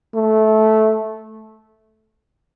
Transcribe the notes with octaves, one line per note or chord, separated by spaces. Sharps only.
A3